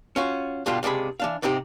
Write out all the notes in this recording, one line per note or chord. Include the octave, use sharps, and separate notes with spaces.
C#4 F4 F#4
G2 B2 D3 G3 F4 G4
C#2 C3 D4 G#4 B5
E3 D4 F5
G#2 C3 C4 D#4 G4